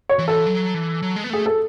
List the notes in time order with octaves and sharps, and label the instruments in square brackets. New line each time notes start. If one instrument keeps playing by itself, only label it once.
[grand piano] C#5
[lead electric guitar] E3
[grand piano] A4
[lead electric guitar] F#3
E3
F#3
G#3
B3
[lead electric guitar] A3 [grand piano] G#4
[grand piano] A4